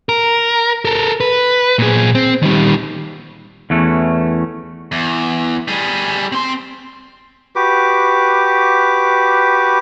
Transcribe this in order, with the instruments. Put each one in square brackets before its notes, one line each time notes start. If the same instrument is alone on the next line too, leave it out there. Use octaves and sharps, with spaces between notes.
[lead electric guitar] A#4
A4 A#4
B4
A#2 G#4
C4
D#3 G3
[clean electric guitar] E2 E3 A3 C#4
[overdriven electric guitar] E2
G3 G#4
C4 C6
[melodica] F#4 G4 B4 D6